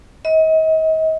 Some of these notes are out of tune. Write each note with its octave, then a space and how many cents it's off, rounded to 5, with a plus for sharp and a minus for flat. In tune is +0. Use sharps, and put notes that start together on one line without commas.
D#5 +35